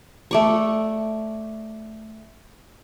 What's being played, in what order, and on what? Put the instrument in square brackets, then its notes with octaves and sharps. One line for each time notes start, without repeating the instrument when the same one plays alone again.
[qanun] A3 D5 C#6